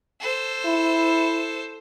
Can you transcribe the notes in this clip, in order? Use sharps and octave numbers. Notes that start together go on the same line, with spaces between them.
A4 C5
E4